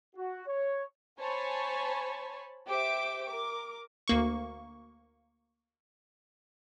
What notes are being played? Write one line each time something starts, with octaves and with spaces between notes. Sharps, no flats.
F#4
C#5
C5 C#5 G#5 A5 B5 C#6
G4 C5 E5 D6 D7
A#4 D6
D2 A#3 C#6